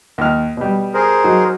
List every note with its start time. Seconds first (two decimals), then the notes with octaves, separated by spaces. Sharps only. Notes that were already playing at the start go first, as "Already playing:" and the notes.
0.18 D#2 F6
0.57 B2 G3
0.94 G#4 A#4 C5
1.24 F#3 D#4